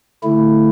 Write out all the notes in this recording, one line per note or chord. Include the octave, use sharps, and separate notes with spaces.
D3 A3 E4